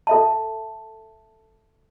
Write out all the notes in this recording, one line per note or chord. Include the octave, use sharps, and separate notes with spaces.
A4 E5 A5